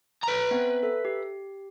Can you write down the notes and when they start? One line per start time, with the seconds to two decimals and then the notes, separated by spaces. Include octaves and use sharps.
0.24 B4 A#5
0.51 B3 C4 E5
0.83 A4 E5 B6
1.05 G4